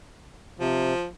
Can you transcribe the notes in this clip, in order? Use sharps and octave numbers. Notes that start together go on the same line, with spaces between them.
C3 F3